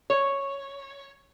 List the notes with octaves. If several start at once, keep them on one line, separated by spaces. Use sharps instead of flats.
C#5